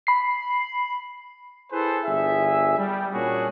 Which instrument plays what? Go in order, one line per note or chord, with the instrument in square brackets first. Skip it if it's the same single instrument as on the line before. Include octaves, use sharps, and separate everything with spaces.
[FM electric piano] B5 C7
[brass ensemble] E4 G#4 A4 B4 C5
G1 G#4 E5
G3
A#2 C#4 D4 F#4 G#4